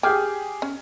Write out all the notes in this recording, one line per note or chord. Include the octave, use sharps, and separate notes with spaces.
G4 G#4 G5 G#5 D6 F6 G6
C#4